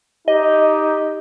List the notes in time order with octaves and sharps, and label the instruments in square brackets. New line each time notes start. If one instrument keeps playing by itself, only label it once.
[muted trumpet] D#4 [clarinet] G4 [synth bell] D#5